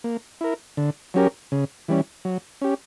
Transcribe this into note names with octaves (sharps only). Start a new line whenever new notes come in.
A#3
E4 A#4
D3
F#3 C#4 G4 A#4
C#3
E3 G3 C#4
F#3
C#4 G4